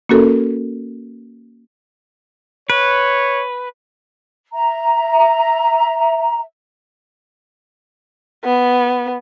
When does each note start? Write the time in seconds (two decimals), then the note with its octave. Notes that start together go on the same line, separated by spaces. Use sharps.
0.09 A#3 C#4 F#4 A4 A#4
2.70 B4 C#5
4.53 E5 A#5
8.45 B3